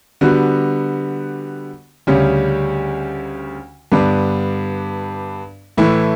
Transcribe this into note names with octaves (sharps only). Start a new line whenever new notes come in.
D3 G3 B3 F#4
D2 C#3 G3 C#4
G2 D3 G3 B3 D4
A2 E3 A3 E4